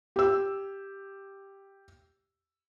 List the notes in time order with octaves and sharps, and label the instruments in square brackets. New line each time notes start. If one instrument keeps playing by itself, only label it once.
[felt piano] G4 E6